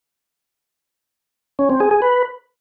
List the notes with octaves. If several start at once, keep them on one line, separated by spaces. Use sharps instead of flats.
C#4
C4
G#4
G#4
B4